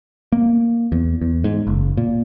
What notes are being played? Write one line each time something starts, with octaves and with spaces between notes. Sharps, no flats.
A#3
E2
E2
G#2
F#1
A#2